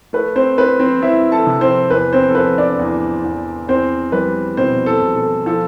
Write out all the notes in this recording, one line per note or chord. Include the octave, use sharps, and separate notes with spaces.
A3 B4
C4 C5
C4 B4
C4 C5
C4 E4 E5
A4 A5
C3
C4 C5
E2 B4
C4 C5
A4
F3 B4
D4 D5
E2
E2
E2 C4 C5
G3 B4
B2 C4 C5
A4
B2
A4
F3 A4